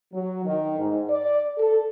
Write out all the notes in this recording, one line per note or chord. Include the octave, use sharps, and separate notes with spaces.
F#3
D#3
G#2
D5
A4